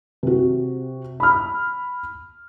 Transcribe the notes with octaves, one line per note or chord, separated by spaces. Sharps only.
C3 F#4
B5 F6